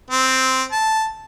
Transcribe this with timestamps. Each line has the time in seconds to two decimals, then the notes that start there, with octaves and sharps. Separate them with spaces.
0.11 C4
0.72 A5